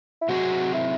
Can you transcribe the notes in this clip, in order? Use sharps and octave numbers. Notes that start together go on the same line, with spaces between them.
E4
C3 F#3 C4 D#4 F#4 G#4
E4